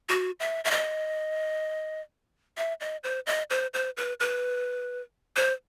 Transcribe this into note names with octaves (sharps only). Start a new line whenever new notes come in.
F#4
E5
E5
D#5
E5
D#5
C5
D#5
C5
C5
B4
B4
C5